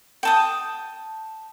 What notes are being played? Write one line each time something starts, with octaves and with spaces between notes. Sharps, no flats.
G5 A5 D#6